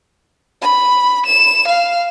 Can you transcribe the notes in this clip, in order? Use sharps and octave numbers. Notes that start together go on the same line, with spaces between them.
B5
E7
F5